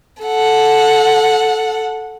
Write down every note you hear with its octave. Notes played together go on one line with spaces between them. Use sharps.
A4 F#5